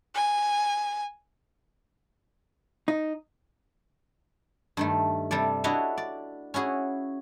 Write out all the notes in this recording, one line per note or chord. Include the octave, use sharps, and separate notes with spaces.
G#5
D#4
G2 D#3 A3
C3 G3 A4 D5
D4 E4 F#4 C#5 D#5 B5
D5
C#4 E4 F#4 G#4